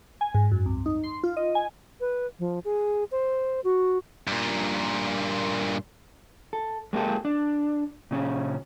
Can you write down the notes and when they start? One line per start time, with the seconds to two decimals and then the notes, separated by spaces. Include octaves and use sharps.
0.21 G#5
0.34 G#2
0.51 F#2
0.66 C2
0.86 D#4
1.04 C6
1.24 F4
1.37 D#5
1.55 G#5
2.00 B4
2.39 F3
2.65 G#4
3.11 C5
3.64 F#4
4.27 G2 A#2
6.53 A4
6.93 G#3 A#3 C#4 G4 A4
7.25 D4
8.11 A#2 C#3 C#4